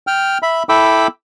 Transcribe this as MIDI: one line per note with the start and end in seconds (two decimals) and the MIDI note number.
0.07 0.38 79
0.07 0.38 89
0.43 0.63 76
0.43 0.63 83
0.69 1.07 64
0.69 1.07 69
0.69 1.07 79
0.69 1.07 83
0.69 1.07 86
0.69 1.07 88